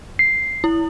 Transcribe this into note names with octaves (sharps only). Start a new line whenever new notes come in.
C7
E4